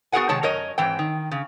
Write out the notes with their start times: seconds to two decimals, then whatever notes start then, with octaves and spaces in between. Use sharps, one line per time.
0.12 B3 F#4 G#4 A#4 F#5 G#5
0.29 C3 D#3 G#3 C#5 A5
0.43 F#2 A#4 C#5 D#5
0.78 G#2 E3 C4 G5
0.99 D#3
1.31 C#3